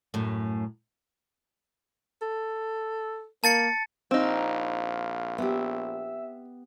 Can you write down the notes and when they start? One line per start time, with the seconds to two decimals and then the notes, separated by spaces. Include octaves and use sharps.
0.14 F#2 A2
2.22 A4
3.44 A#3 A5 A6 C#7
4.11 A#1 C4 D#4 F5
5.38 B3 G4 E5